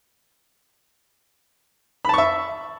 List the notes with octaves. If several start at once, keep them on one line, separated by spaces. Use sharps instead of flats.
E5 A5 B5 C#6